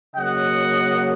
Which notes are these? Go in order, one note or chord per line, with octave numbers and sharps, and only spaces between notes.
C#3 F#3 A#3 D#5 F#5